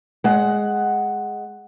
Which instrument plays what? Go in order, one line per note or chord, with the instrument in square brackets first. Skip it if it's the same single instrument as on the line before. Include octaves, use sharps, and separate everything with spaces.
[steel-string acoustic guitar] G#3 F#5